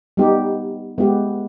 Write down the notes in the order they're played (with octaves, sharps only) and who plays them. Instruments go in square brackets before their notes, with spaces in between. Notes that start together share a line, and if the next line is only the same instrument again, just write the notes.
[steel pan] G3 B3 D#4 G4
G#3 B3 E4 G4